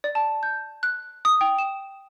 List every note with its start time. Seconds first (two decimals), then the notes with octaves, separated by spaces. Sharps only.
0.04 D5
0.15 A5
0.43 G6
0.83 F#6
1.25 D#6
1.41 G5
1.58 E7